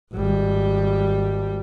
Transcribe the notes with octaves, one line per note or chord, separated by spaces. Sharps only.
G#1 G3